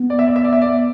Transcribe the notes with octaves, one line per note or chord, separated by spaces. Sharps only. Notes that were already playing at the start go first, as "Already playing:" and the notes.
Already playing: B3
D5
E5
D5
E5
D5
E5
D5